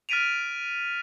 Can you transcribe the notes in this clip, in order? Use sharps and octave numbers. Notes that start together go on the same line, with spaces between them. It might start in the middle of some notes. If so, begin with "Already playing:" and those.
F6 A6 B6 D7 D#7 F7